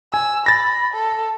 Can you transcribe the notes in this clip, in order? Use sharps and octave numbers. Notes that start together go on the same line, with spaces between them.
G#5 E6
B5 A6 A#6
A4